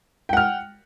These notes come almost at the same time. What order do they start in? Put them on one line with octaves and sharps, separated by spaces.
G5 F#5 F6